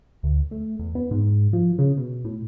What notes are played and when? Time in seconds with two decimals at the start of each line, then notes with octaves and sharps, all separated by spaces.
0.23 D2
0.51 A3
0.79 E2
0.95 B3
1.11 G#2
1.53 F3
1.79 C#3
1.97 B2
2.24 A2